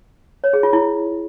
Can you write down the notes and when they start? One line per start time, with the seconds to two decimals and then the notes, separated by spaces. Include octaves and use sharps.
0.44 C#5
0.53 G#4
0.63 F4
0.73 E4